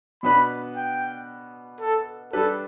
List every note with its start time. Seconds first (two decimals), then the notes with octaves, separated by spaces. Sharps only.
0.23 B2 B3 D4 B4 B5
0.76 G5
1.80 A4
2.33 G3 D4 G4 A4 B4